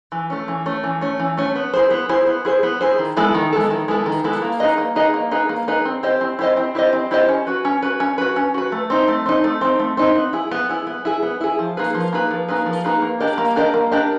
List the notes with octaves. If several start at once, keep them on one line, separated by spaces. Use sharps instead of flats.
E3
A3 C#4
E3
A3 C#4
E3
A3 C#4
E3
A3 C#4
B3
E4 G#4 C5
B3
E4 G#4 C5
B3
E4 G#4 C5
B3
E4 G#4 C5
D#3
G#3 B3 E4 A4
D#3
G#3 B3 E4 A4
D#3
G#3 B3 E4 A4
D#3
G#3 B3 E4 A4
A#3
D#4 G#4 B4 D#5
A#3
D#4 G#4 B4 D#5
A#3
D#4 G#4 B4 D#5
A#3
D#4 G#4 B4 D#5
C4
E4 G4 C5 D#5
C4
E4 G4 C5 D#5
C4
E4 G4 C5 D#5
C4
E4 G4 C5 D#5
C#4
F#4 B4
C#4
F#4 B4
C#4
F#4 B4
C#4
F#4 B4
A3
C4 D#4
A3
C4 D#4
A3
C4 D#4
A3
C4 D#4
B3
E4 G#4
B3
E4 G#4
B3
E4 G#4
B3
E4 G#4
F3
A#3 D#4 G#4 B4
F3
A#3 D#4 G#4 B4
F3
A#3 D#4 G#4 B4
F3
A#3 D#4 G#4 B4
A#3
D4 G4 A#4 D#5
A#3
D4 G4 A#4 D#5
A#3
D4 G4 A#4 D#5